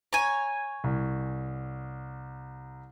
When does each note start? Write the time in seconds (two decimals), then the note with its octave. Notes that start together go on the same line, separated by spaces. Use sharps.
0.13 C#5 G#5 A#5
0.84 C2